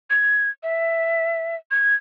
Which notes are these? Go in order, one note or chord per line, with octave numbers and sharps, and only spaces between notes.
G#6
E5
G#6